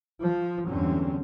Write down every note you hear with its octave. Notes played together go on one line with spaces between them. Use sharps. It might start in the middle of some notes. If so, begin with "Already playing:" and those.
F3
E2 G2 D3 F#3 C4 C#4